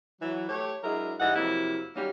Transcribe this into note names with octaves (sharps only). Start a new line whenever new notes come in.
E3 F#3
A3 G4 C#5
F#3 G#3 D4 E4 A#4
G#2 E3 G3 D#5 F#5
F2 C3 F#3 A#3 E4
D#3 F#3 G3 A#3 C#4